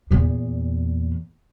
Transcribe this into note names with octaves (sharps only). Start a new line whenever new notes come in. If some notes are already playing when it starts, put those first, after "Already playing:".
E2 A#2